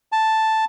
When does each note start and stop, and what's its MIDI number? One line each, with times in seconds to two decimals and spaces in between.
0.12 0.65 81